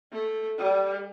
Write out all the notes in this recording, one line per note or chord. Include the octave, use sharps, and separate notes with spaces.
A3
G3